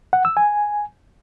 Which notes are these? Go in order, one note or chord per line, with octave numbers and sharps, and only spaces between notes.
F#5
E6
G#5